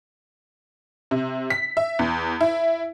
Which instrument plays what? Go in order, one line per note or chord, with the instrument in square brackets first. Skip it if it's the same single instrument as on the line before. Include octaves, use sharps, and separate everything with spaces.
[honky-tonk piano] C3
B6
E5
E2
E4